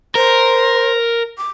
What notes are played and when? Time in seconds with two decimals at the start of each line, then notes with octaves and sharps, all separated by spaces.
0.15 A#4 C5
1.38 D6